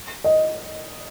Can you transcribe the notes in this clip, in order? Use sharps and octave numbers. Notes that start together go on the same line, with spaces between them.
D#5